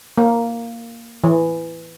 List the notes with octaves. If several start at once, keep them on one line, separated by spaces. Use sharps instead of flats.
A#3
E3